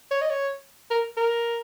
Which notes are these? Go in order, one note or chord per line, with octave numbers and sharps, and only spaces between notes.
C#5
D#5
C#5
A#4
A#4